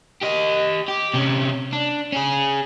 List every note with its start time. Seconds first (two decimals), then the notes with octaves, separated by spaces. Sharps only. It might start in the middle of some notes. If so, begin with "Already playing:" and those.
0.22 G4 D#5
0.88 G4
1.14 C3 C#4
1.73 D4
2.12 C#4 G#4